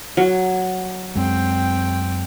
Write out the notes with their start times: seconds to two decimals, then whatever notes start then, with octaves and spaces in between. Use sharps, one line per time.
0.17 F#3
1.16 F#2 G#3 C4 G5